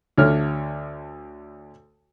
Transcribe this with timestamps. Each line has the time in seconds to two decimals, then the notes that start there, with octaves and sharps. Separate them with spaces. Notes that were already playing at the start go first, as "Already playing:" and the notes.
0.18 D2 D3 C#5 F6